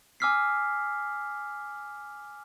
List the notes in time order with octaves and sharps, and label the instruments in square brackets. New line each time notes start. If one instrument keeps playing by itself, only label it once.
[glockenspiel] G#5 D6 E6 F6 B6 C7